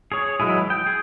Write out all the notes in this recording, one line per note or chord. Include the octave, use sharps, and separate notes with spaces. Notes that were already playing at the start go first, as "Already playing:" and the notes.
G#4 C#5
E3 F#3 G#3 E4 G#4
G5
G#4